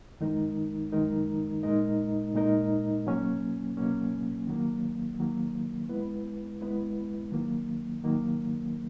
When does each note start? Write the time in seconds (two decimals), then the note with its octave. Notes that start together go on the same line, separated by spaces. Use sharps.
0.21 F#2 D#3 G#3 D#4 A#4
0.92 F#2 D#3 G#3 D#4 A#4
1.63 A#2 G#3 D#4 A#4 D#5
2.34 A#2 G#3 D#4 A#4 D#5
3.06 B2 F#3 A#3 C#4
3.77 B2 F#3 A#3 C#4
4.47 D#3 F#3 A#3
5.19 D#3 F#3 A#3
5.89 G#3 B3 E4 B4
6.61 G#3 B3 E4 B4
7.32 D#3 F#3 A#3
8.04 D#3 F#3 A#3